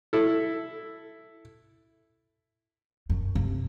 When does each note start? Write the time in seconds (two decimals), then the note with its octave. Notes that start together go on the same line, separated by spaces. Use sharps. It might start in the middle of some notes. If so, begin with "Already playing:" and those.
0.13 E4 A4
3.10 F#2
3.35 C3